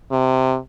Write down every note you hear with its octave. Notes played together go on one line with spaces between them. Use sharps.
C3